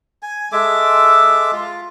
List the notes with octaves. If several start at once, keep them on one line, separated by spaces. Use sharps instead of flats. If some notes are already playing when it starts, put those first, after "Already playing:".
G#5
G#3 A4 E5 D6
F4